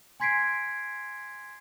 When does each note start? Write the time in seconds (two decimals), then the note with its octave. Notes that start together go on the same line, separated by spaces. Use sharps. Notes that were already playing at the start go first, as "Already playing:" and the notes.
0.20 G#5 C6 G#6 B6 C7 D7